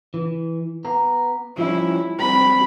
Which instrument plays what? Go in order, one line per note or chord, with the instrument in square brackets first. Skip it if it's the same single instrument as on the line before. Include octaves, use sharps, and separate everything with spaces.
[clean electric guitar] E3
B3 A#5
[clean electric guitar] F3 G3 C#4 [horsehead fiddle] E4
[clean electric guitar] G3 C4 [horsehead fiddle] B5